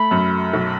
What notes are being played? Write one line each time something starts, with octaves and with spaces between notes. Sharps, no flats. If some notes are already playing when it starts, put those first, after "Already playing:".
Already playing: A3 B5
F#2
B1